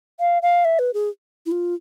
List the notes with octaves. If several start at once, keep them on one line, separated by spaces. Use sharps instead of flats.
F5
F5
E5
B4
G#4
E4
F4